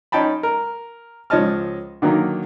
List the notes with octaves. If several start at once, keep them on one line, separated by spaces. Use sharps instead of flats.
C#4 D#4 G5 A5 B5
A#4
C#2 F3 C#5 D#5 A5 F6
D3 D#3 F#3 A#3